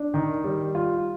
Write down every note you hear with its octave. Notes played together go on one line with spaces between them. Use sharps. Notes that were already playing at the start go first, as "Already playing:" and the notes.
Already playing: D4
D#3
G3
F4